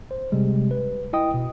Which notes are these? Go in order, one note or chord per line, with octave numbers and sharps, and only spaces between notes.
C5
C3 G3 G#3
B4
E4 D#5 G5 D#6
B2